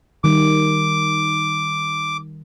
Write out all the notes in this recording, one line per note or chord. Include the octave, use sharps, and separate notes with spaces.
D#3 G3 D#4 D6